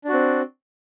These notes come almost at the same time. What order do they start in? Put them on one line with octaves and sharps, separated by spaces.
D4 F#4 C4